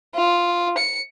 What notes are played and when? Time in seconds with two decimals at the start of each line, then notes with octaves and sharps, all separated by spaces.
0.14 F4
0.77 C#7